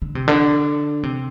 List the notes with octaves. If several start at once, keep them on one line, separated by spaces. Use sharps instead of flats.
D3
C3
D3
C3